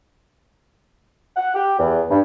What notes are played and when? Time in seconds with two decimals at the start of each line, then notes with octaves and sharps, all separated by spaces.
1.37 F#5
1.55 G4
1.79 E2
2.11 G2